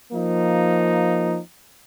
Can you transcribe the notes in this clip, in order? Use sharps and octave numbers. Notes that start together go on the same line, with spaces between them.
F3 A#3 D#4